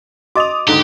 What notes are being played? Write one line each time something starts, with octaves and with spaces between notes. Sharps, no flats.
F#4 D#5 D6 D#6 F7
D#2 G#2 D3 G4